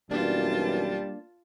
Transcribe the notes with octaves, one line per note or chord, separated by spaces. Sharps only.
B1 F#2 E3 G3 A#3 D4 F4 A5